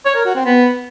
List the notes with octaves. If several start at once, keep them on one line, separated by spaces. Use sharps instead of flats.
C#5
A#4
F#4
C4
B3